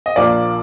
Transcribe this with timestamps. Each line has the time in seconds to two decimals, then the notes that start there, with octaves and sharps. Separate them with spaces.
0.06 D#5
0.16 A#1 A#2 F3 A#3 D5